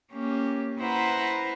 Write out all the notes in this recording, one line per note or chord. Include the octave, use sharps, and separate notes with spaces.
A#3 C#4 G4
E4 B4 C5 F#5 A#5